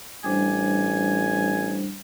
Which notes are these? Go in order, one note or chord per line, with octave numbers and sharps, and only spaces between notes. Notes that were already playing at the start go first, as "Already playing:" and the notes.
A1 G3 D4 C5 G#5